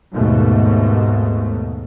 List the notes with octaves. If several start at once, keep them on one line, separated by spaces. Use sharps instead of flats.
D#2 G#2 B2 A3